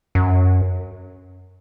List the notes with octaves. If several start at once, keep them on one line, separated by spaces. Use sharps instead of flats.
F#2